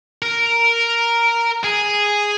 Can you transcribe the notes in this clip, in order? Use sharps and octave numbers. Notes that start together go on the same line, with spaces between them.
A#4
G#4